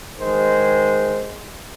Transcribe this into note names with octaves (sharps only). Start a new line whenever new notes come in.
D#3 G#3 C5